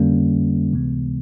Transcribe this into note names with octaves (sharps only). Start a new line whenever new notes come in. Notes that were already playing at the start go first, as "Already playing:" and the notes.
Already playing: F2 D3 G3 A#3 C#4
C#2 C3 E3 G#3 B3